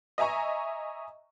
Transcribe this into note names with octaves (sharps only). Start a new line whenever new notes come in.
D#5 E5 G#5 A#5 C#6